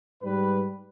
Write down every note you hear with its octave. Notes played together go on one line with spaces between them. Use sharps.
G#2 G3 B4